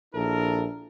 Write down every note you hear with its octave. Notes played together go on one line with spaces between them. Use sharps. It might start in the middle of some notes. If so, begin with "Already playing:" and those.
A#1 E4 A4 A#4